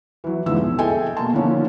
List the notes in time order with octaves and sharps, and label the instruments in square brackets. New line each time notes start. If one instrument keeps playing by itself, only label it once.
[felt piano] E3 F#3
F1 G#2 D3 E3 F3 E6
B1
G#4 A4 D#5 E5 G5 G#5
B2 A#3 A5
D3 D#3 F3 A#3 C#4